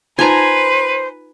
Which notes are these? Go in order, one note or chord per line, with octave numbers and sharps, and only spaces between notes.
D#4 F4 B4 C5 G#5 A#5